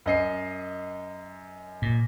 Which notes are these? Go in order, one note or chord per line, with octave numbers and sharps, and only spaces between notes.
F#2 D#5 C7
A#2